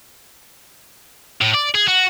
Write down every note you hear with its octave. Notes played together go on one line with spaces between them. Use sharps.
A2
D5
G#4
F#4